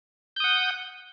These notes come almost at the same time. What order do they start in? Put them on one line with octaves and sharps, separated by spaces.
G6 D#6 F#5